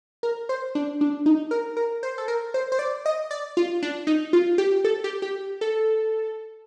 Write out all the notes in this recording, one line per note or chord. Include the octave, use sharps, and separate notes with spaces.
A#4
C5
D4
D4
D#4
A#4
A#4
C5
A4
A#4
C5
C5
D5
D#5
D5
F4
D4
D#4
F4
G4
A4
G4
G4
A4